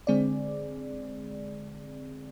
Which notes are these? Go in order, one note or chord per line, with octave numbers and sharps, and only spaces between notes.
D3 G#3 C4 G#4 D5